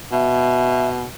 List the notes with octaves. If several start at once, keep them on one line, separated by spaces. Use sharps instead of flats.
B2 E5